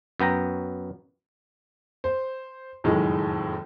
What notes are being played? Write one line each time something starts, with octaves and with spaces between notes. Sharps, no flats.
F#2 B3 G5 A#5
C5
F#1 F2 A2 D#3 G#3